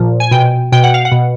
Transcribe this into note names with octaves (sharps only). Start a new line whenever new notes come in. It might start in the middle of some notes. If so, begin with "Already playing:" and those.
Already playing: A#2 F3
G#5
B2 G5
B2 G5
F#5
F5
F#5
B2